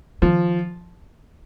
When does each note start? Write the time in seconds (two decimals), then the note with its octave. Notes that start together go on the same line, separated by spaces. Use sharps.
0.22 D#3 F3